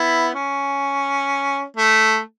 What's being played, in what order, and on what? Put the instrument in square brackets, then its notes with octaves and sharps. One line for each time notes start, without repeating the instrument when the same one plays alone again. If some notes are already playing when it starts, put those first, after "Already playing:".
Already playing: [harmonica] B3 E4
C#4
A3